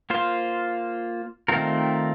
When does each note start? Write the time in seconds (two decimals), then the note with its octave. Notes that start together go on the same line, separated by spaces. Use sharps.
0.10 A#3 F4 C5
1.48 D#3 A3 C4 F4 A#4